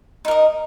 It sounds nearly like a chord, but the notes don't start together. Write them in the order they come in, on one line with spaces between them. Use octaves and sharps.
D#4 A#4 D#5